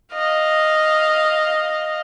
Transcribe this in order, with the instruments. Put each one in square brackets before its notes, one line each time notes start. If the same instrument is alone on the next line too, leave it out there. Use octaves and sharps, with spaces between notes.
[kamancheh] D#5 F5